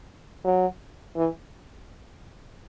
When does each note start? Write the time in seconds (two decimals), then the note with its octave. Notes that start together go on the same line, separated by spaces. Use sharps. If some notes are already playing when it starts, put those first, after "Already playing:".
0.44 F#3
1.16 E3